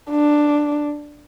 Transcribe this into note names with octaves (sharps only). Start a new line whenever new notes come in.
D4